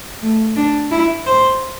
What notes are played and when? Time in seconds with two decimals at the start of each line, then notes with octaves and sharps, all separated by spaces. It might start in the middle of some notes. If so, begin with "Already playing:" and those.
0.22 A3
0.56 D4
0.91 E4
1.26 C5